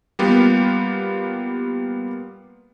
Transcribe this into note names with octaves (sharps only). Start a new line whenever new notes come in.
G3 A#3 B3 F4 G4